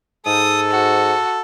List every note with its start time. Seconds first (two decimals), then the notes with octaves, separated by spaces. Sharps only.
0.26 G#2 A4 D#6
0.72 F#4